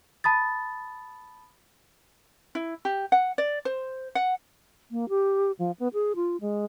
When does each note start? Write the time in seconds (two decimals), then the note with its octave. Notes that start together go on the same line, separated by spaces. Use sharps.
0.24 A5 B5 D#6 A6
2.55 E4
2.85 G4
3.12 F#5
3.38 D5
3.65 C5
4.15 F#5
4.91 A#3
5.09 G4
5.59 F3
5.80 B3
5.94 G#4
6.16 F4
6.41 G#3